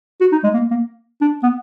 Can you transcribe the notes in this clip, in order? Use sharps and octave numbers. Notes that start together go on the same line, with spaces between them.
F#4
D#4
G#3
A#3
A#3
D4
B3